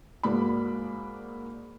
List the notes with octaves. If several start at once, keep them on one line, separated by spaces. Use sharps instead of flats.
G#2 G#3 A#3 F#4 D5 B5